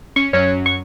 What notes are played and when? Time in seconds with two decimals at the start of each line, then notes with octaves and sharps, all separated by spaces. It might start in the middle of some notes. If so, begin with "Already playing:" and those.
0.16 C#4 C#6
0.33 F#2 F#3 C#4 C#5
0.66 C#6